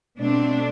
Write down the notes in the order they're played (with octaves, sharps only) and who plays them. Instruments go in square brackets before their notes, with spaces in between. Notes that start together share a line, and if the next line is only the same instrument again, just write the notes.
[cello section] B2 A3 C4 D4